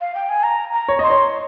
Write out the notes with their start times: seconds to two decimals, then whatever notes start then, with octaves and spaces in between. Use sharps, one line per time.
0.01 F5
0.15 G5
0.29 G#5
0.43 A#5
0.73 A#5
0.89 C#5
0.99 D#5 C6
1.10 C#5